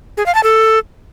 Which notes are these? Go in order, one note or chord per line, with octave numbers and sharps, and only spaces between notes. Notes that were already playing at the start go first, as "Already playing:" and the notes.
G#4
F5
A5
A4